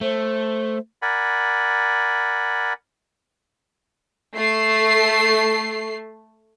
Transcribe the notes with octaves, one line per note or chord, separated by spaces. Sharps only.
A3 C5
A#4 D5 F#5 G#5 B5
A3 C7